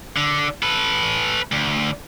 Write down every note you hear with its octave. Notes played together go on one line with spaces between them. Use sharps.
D3
A4 B4
D2